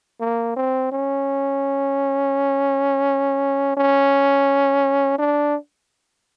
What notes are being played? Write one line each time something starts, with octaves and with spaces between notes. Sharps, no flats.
A#3
C4
C#4
C#4
D4